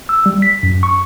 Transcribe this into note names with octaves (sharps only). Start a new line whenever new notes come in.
E6
G3
B6
F#2
C#6